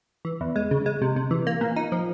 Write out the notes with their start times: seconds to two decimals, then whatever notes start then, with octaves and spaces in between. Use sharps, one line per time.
0.25 E3
0.41 E2
0.56 G#3
0.71 C#3
0.86 G#3
1.02 C3
1.16 C3
1.31 E3
1.47 A#3
1.61 A#2
1.76 D#4
1.92 F3